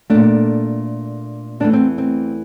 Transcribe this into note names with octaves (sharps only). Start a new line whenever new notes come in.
A#2 A3 D4
E2 E3 A3 D4
C4
C4